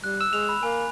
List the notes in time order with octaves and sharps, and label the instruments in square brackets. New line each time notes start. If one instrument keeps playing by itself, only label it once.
[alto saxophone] G3 [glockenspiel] F#6
[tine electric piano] E6
[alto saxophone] G#3 [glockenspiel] F7
[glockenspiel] B5
[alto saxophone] A#3 [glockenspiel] G#5